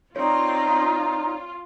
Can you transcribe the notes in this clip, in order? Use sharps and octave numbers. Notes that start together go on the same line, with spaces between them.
C4 D#4 F4 C#5 D5